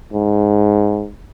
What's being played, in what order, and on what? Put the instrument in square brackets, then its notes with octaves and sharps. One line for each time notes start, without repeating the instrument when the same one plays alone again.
[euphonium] G#2